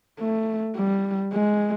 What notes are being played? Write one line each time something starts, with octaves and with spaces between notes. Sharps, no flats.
A3
G3
G#3